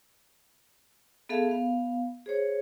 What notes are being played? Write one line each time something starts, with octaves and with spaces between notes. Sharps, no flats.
B3 G#4 A4 E5 F5 A5
B3 F5
G#4 C5 C#5